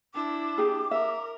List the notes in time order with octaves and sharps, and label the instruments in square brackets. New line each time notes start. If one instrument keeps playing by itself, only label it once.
[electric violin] D4 E4 [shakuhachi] D6
[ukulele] G4 G#4
[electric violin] A#4 [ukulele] E5